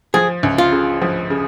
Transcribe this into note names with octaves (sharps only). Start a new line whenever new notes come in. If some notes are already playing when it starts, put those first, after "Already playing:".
F3 G#4
C#2
F4
C#3
F3
C#3